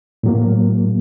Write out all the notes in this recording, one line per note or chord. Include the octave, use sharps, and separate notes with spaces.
A2 F#3 A#3